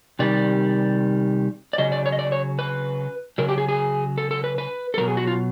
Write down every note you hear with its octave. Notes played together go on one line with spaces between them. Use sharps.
C3 D#3 G3 D5
D5
C#3 F#3 D#5
D5
C#5
D#5
D5
C#5
B4
C#3 F#3 A#4
G4
G#4
G#4
A4
A4
B4
B4
A4
B2 F#3 A#4
G#4
F#4
F4